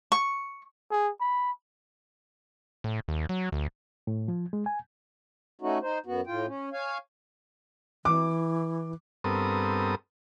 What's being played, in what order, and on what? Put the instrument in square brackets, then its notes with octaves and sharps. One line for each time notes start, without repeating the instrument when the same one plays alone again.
[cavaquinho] C#6
[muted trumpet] G#4
B5
[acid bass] A2
D#2
F#3
D2
[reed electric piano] A2
F3
G#3
G#5
[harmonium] A3 C#4 D#4 F#4
D#4 C5
F#2 B3 F#4
A2 F4 G5
C#4
C#5 F5 G#5
[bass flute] E3 [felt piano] D6
[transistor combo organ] G2 B3 C4 A4 A#4 D#6